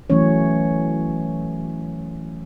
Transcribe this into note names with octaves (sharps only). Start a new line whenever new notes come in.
E3 F#3 A3 C#4 C#5